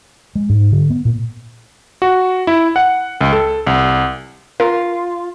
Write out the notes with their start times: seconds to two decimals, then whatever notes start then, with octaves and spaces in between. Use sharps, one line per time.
0.35 G#3
0.49 G#2
0.72 D3
0.90 B3
1.05 A#2
2.02 F#4
2.47 E4
2.76 F#5
3.21 C#2
3.33 A4
3.67 C2
4.60 F4 A#4